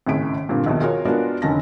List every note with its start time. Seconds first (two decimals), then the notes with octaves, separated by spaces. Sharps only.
0.07 G#1 A2 C#3 G#4 B6 D7
0.49 G2 A#2 D3 C4
0.66 A#1 D#2 B2
0.80 F4 F#4 G#4 A#4 C#5
1.05 G#3 B3 D4 F4 F#4 A#4
1.42 F1 D3 D#3 C#4 A5 A#6